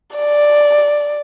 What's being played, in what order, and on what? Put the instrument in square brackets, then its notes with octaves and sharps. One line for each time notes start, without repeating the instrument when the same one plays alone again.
[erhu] D5